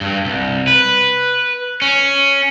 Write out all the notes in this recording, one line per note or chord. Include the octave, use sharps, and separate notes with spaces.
G2
C2
B4
C#4